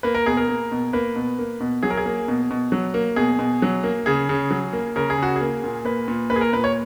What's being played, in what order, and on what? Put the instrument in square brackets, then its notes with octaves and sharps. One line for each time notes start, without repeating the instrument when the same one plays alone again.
[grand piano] A#3 B4
A#4
B2 G#4
A#4
A#3
B2
A#3 B4
B2
A#3
B2
F#3 G#4
A#4
G#4
A#3
B2
B2
F#3
A#3
B2 G#4
B2
F#3
A#3
C#3 G#4
C#3
F#3
A#3
C#3 A#4
G#4
C#3 F#4
G#4
A#3
A#2
A#3 B4
A#2
A#3 B4
G#4
A#4
A#2 B4
C#5